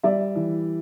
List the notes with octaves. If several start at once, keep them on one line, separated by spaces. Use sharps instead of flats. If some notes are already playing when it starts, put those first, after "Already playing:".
G3 D5 E5
E3